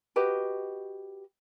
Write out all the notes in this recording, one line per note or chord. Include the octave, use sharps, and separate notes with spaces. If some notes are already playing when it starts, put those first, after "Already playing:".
F#4 G4 B4 D#5